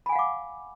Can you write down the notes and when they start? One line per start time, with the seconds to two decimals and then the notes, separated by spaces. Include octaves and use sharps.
0.06 B5
0.09 G#5
0.12 F#5
0.16 F5
0.19 D6